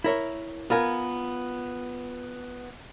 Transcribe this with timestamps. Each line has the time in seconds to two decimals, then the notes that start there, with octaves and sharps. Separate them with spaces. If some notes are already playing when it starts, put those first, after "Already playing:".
0.04 E4 A#4 C#5
0.70 B3 F4 A#4 G#5